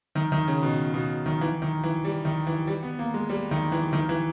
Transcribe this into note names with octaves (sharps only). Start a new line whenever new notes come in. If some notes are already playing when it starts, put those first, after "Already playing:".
D#3
D#3
C#3
B2
B2
D#3
E3
D#3
E3
G3
D#3
E3
G3
B3
A#3
G#3
G3
D#3
E3
D#3
E3